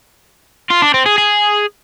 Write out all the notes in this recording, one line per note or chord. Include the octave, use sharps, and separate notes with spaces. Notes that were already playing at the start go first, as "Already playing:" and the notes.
F4
D4
C4
G#4
G#4